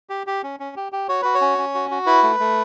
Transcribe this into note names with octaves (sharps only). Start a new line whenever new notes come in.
G4
G4
C#4
C#4
G4
G4
F#4 C#5
F#4 B4
C#5
C#4
C#4
F#4
F#4
E4 B4
A3
A3